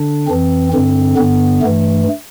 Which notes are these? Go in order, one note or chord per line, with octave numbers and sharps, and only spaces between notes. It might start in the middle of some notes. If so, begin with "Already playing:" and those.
Already playing: D3 D4
F2 E3 C4
G2 D3 C4
G2 D3 B3
G2 E3 A3